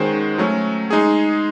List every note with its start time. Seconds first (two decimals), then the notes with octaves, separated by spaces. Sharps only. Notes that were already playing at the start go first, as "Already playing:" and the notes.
Already playing: D#3 G#3 C#4 F#4 C5
0.38 F#3 A3 C#4
0.90 G#3 D#4 G#4